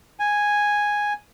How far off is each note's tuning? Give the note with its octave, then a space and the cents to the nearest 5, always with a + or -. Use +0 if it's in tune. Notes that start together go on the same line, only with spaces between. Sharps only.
G#5 -5